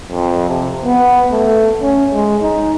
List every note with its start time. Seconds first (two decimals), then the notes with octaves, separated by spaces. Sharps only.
0.11 F2
0.49 C3
0.85 B3
1.32 A3
1.82 C#4
2.13 G#3
2.42 D#4